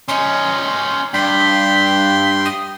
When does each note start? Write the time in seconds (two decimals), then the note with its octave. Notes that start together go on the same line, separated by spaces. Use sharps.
0.08 C#4 D#4 C6
1.14 G2 G5 C6 B6
2.45 D#6